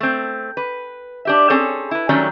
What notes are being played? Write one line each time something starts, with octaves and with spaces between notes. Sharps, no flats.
A3 C4
B4
D4 G4 E5
C4 C#4 G#4 A4 C#5
E4 B4
D#3 F#3 G3 A3 C#4 D4